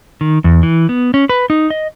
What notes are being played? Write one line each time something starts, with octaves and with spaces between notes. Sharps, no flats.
D#3
E2
E3
B3
C#4
B4
D#4
D#5